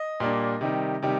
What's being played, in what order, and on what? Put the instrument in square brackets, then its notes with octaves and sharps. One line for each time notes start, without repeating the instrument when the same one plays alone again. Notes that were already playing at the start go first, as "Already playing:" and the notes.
Already playing: [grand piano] D#5
A#2 G3 A#3 D4
C3 D#3 G3
C3 D#3 G3